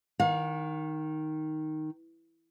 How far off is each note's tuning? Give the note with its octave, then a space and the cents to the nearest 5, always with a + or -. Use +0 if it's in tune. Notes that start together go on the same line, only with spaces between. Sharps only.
D#3 +0 F5 +45